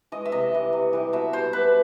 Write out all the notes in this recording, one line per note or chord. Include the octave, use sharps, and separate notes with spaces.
E3 G#3 D#5
E5
C3 D#5
E3 G3
C3
E3 G3
B2 E5
G3 C5
B2 B4